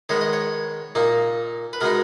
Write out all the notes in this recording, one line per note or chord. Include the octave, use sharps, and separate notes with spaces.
D#3 G#3 B3 C#5
D#5
C#5
A#2 A#3 D#4
B4
B2 G#3 B3 D#4 A#4